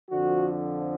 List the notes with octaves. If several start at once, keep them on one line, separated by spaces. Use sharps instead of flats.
F2 D3 F3 F#4